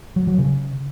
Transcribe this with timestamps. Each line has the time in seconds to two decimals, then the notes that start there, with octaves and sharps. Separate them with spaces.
0.16 F#3
0.27 F#3
0.38 C#3